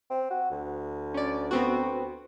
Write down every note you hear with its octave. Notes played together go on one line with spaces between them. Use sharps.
C4
F#4
D2
C#4 D5
B3 C4 F#4